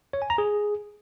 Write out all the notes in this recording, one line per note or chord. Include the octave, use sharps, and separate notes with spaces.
C#5
G#5
A#5
G#4